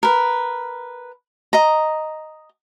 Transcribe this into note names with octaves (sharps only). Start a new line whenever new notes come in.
A#4 B4
D#5 A#5